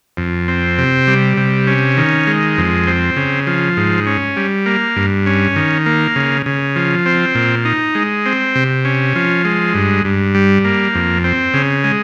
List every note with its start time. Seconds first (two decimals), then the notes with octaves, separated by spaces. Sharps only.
0.17 F2
0.48 C4
0.78 C3
1.07 G3
1.37 C3
1.67 C#4
1.97 D#3
2.27 G#3
2.58 F2
2.87 C4
3.16 C#3
3.47 F3
3.77 G#2
4.07 C#4
4.37 G3
4.66 A#3
4.96 G2
5.26 C#4
5.56 D#3
5.86 A#3
6.16 C#3
6.46 C#3
6.76 F3
7.06 C4
7.35 A#2
7.65 D#4
7.95 G#3
8.26 C4
8.55 C3
8.85 C#4
9.16 F3
9.45 G#3
9.74 G2
10.05 G2
10.35 G3
10.65 A#3
10.95 F2
11.24 C4
11.54 C#3
11.84 G#3